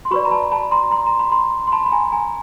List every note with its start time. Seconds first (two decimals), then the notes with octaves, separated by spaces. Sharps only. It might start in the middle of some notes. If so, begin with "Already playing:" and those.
0.05 C6
0.11 F#4 B4 D5 B5 C#6
0.25 A#5
0.31 A5 B5
0.52 A5 B5
0.71 A#5 C6
0.91 A#5 C6
1.07 A#5
1.19 B5
1.32 A#5 C6
1.67 C6
1.72 A5 B5
1.86 B5
1.92 G#5 A#5
2.07 B5
2.12 G#5 A#5